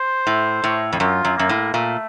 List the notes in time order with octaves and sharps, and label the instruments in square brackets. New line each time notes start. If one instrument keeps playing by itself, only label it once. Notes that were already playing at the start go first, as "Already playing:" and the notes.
Already playing: [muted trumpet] C5
[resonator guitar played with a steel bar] A2
A2
F2
[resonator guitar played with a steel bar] F#2 [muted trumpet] F4
[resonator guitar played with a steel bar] F#2
[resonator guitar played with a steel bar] F#2 [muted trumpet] A#3
[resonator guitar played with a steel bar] A2
[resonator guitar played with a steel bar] A#2 [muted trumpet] A3